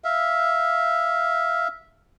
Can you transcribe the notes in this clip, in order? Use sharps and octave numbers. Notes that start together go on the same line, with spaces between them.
E5 F5